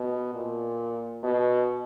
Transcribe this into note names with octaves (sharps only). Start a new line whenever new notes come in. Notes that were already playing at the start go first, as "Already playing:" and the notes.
Already playing: B2
A#2
B2